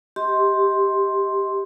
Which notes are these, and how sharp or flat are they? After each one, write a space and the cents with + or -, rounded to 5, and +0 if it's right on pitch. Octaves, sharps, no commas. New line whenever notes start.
G4 +0 D#5 +35 C6 +5